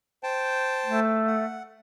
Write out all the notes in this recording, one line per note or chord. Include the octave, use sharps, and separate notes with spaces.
C5 G5 A5
A3
F#5